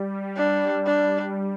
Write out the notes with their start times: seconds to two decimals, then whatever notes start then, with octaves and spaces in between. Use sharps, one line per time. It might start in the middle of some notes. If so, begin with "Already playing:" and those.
Already playing: G3
0.37 D4
0.86 D4